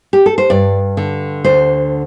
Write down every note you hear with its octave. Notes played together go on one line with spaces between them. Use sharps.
G4
A4
C5
G2 D5
D3
D2 C5